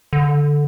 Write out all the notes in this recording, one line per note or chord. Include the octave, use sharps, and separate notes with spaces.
D3